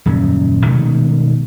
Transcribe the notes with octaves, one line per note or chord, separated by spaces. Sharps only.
D#1 F#2 C#3
B2 D#3 G#3 A3